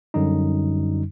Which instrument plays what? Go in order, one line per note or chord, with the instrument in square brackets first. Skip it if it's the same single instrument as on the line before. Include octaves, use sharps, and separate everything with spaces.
[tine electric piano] F#2 D3 G3 D#4